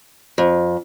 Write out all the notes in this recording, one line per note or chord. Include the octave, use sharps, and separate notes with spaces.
F2